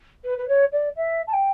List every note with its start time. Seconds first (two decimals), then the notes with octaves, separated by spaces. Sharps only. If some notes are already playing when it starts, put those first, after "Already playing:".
0.24 B4
0.38 B4
0.48 C#5
0.72 D5
0.96 E5
1.27 A5
1.33 G5